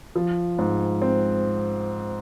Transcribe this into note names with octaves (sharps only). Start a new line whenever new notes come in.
F3
G#2
C4